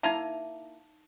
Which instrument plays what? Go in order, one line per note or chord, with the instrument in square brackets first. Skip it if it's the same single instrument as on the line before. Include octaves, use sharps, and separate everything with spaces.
[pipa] A#3 E4 A#5 [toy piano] D#4 A5